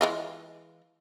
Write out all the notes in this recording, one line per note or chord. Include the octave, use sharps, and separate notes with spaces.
E3 G#3 F4